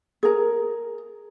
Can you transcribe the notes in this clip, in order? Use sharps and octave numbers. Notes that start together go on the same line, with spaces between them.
G#4 A#4